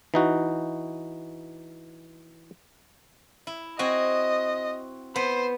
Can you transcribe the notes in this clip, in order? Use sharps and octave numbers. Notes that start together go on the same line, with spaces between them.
E3 D#4 F#4
E4
C4 F#4 D#5 G#5
B3 C5